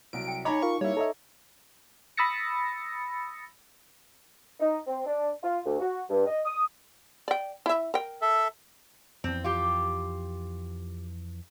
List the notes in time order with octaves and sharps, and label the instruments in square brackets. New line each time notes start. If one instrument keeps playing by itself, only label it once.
[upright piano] C2 F#3 [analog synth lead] D7
[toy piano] G5
[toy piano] D#4 D#5 [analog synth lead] C#5 [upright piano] A#5 B5 D6
[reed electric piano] F4 A#4 F5 [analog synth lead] C#6
[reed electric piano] G3 E5 [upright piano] A#3 E4 [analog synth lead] C#5
[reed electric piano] A4 D#5 E5 [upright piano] A#5
[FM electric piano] B5 D#6 E6 A6 A#6 C#7
[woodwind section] D#4
C4
D4
F4
D2
F#4
G2
D#5
D#6
[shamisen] D5 G5
E4 E5
A#4 G5
[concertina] A4 E5
[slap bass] F2 E3 [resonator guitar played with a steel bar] C4
[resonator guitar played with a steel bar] F4 G4